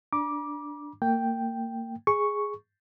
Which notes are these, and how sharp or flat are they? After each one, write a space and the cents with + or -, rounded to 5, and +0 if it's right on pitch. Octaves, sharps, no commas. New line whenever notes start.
D4 +0 A#5 +45 D6 +0
A#3 -30 G5 +0
G#4 +0 C#6 +0